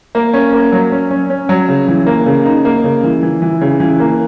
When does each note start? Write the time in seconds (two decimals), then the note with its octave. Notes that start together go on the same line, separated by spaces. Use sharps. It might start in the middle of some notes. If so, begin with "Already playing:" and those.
0.15 A#3
0.33 C#4
0.53 A#3
0.72 F#3
0.92 C#4
1.11 C#4
1.30 C#4
1.49 F#3
1.68 C#3
1.88 E3
2.06 A#3
2.26 C#3
2.45 D#4
2.65 A#3
2.84 C#3
3.03 E3
3.23 E3
3.42 E3
3.61 C#3
3.80 E3
4.00 A#3